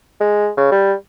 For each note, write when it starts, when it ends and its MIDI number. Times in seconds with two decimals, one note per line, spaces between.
0.20 0.50 56
0.57 0.72 49
0.72 0.94 55